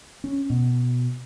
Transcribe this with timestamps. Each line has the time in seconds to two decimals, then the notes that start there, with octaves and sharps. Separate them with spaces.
0.24 C#4
0.50 B2